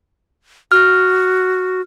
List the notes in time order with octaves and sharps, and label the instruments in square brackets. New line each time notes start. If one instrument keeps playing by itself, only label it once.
[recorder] F#4 [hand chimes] F6